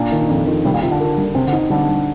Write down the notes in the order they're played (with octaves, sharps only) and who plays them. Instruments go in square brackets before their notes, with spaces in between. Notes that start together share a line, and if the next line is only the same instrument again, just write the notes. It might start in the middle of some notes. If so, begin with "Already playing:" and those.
Already playing: [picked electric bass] A#2 [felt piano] D4
[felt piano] D#3
F2
D#3
[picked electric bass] C3 [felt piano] G3
[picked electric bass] A#2
[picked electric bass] C3 [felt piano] F4
[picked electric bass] D3
[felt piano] A#4
G3
[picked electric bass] C3 [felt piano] C4
[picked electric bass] D3
[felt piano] D#4
[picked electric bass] D3 [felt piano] G3
[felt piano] G3